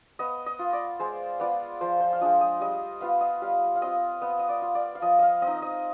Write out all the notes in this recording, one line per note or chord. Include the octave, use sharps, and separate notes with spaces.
B3 D#5
D#5
F4
D5
G#3 C5
B3 F4 D5
F3 C5
C5
F5
G#3 D4 F4 D#5
D#5
G3 D#5
B3 F4 F5
D#5
G3 F5
F5
C4 F4 D#5
B3 D#5
D#5
D5
F4
D5
F5
F3 D#5
D#5 F5
C4 D#5
D#4
D#5